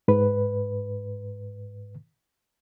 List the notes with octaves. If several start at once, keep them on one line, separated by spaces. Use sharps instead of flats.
G#2 B4